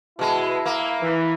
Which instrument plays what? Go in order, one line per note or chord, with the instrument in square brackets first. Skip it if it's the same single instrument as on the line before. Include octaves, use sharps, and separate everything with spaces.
[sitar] B2 G#3 [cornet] E4
[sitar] A#3
[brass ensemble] E3